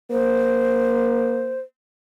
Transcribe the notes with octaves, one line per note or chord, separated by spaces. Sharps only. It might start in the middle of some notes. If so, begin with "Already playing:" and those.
A#3 C5